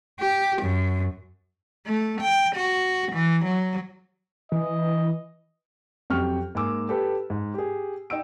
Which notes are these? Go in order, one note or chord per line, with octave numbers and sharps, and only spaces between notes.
G4
F#2
A3
G5
F#4
E3
F#3
E3 D#5
F2 F#3 G4 G5 C#6 F6
G#2 A#3 G#5 D6 E6
G4 A4 B4
G#2
G4 G#4
D#4 G5 E6 D7